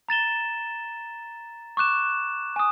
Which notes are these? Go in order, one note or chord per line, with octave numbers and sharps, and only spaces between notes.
A#5 A6 E7 G7
C#6 D6 F#6 E7
G#5 D#6